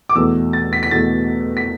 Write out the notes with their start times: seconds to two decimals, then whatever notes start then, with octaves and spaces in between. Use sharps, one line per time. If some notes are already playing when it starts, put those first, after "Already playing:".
0.09 D6
0.15 E2 B2 A3 E6
0.53 A6
0.73 B6
0.83 B6
0.91 E2 B2 A3 A6
1.57 B6